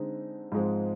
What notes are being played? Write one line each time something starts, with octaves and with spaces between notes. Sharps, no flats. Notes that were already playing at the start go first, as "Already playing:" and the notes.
Already playing: D3 G#3 C4 D#4
G#2 F3 G#3 C4